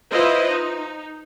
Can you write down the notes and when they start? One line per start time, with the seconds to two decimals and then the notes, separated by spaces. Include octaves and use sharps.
0.11 E4 F4 B4 C5 D#5
0.49 D#4